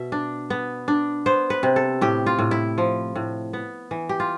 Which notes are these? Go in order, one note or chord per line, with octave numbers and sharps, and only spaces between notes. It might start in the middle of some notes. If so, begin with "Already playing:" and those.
Already playing: B2 E5
D4
B3
D4
B3 C5
B4
C3
A4
A2 G4
F4
A2
E4
F3
A2
B3
E3
G4
F4